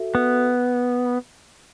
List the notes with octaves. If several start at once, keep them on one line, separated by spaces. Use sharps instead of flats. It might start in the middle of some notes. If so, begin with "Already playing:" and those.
Already playing: F#4 A4 E5
B3